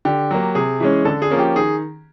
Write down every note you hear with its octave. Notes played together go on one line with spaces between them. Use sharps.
D3 G4
F#3 A#3
C3 G#4
E3 G#3 C#4
D3 A4
G#4
F3 A#3 C#4
G4
D#3 G#4